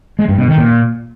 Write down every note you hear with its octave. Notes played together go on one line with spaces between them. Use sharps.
G#3
G2
B2
D#3
A#2